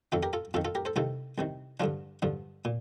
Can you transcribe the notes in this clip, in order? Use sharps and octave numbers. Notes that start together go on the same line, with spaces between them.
F2 D#3 F4 A4
G4 A#4
F4 A4
F2 D#3 F4 A4
F4 A4
G4 A#4
A4 C5
C2 C3 D#3 F4 A4
C2 C3 D#3
G2 D3 F3 D4 F4
G2 D3 F3
A#2